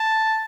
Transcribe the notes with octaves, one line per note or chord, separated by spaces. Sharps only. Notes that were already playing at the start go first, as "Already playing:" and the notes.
Already playing: A5